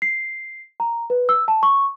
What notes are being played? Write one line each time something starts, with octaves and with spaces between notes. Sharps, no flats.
C7
A#5
B4
E6
A5
C#6